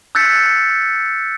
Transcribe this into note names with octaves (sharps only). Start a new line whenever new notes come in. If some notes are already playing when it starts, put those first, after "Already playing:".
E6 F#6 G6 A6 B6 C#7